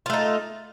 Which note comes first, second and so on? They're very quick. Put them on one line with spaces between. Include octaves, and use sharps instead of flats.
F4 A3 D#4